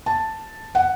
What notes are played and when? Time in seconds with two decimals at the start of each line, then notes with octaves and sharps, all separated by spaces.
0.06 A5
0.75 F#5